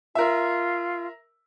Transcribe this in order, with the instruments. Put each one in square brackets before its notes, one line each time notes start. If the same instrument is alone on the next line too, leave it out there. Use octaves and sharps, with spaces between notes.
[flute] F4 [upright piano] A#4 E5